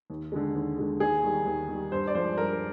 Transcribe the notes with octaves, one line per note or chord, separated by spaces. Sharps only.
D#2
D3 G#3
D#2
D3 G#3
D#2 G#4
D#3 G3
D#2
D#3 G3
G2 C5
D5
F3 G#3 C5
G2 A#4